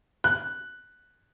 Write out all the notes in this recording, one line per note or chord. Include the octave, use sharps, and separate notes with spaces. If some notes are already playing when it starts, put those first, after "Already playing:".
F#6